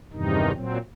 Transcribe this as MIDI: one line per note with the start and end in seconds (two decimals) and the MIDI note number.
0.13 0.52 40
0.13 0.52 43
0.13 0.52 48
0.13 0.52 51
0.13 0.52 63
0.54 0.78 46
0.54 0.78 54
0.54 0.78 60